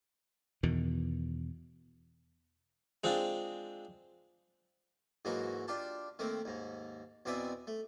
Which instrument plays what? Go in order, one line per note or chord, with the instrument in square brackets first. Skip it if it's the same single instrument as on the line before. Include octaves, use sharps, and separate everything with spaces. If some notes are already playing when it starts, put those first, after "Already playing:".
[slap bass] E2 B2 D#3
[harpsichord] G#3 C4 D4 F4
G#2 E3 F#3 G#3 A#3 F#4
D4 F4 G4 A5
D#3 A3 A#3 C4
D#2 G#2
E2 B2 C4 D5 E5 G#5
A3